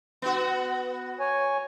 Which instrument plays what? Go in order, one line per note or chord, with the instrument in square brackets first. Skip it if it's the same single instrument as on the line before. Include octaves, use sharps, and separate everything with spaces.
[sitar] B3 F#4
[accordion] C#5 G#5